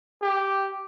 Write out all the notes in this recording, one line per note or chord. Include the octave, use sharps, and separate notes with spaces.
G4